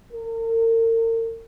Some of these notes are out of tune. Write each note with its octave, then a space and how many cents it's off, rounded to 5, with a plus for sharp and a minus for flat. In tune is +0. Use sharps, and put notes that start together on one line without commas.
A#4 -40